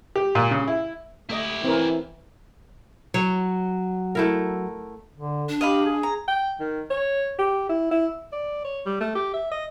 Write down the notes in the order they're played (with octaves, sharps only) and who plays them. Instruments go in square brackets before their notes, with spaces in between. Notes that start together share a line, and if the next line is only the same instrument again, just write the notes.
[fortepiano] G4
A#2
C#3
E4
[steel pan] A3 D#5 [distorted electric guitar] E4 G4
[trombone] E3 [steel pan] C4 A#4
[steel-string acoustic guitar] F#3 [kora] C#5
[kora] A3 E4 A#4
[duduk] D3
[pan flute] D4
[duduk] G4 [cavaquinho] D#5 F5 B5
[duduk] G#4
[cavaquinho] A#5
[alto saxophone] G5
D#3
C#5
G4
E4
E4
D5
C#5
G3
A3
G4
E5
D#5